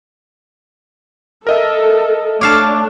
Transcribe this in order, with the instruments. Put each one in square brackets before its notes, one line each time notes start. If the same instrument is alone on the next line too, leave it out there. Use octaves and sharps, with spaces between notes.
[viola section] A4 [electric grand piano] A#4 D#5 E5
[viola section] A3 D4 [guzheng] C#5 F5 A5 [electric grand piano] D6